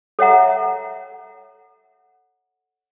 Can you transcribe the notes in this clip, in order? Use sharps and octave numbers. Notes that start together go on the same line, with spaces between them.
A4 C#5 E5 F#5 A#5